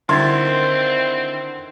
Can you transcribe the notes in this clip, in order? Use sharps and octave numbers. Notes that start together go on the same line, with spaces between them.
D3 D#3 C4 E4 F#5 C6 G#6 A6